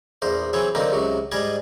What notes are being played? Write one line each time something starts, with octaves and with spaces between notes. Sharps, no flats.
A#1 E2 A#4 C5
E3 F#3 C4 G#4 C#5 E5
D3 F#3 A#3 C4 D#4 A#4
C#2 C3 F#3 F#4
G#2 G3 G#4 D5 D#5 G#5